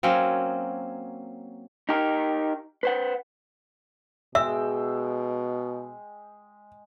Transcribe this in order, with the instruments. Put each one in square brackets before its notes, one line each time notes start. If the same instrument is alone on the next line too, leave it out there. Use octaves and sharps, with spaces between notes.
[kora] F#3 A#3 C4 C#4
[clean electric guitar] D#4 G4 A#4
B4 C5 F#5
[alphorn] B2 [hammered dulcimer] G#3 G5 [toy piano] E5 [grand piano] E6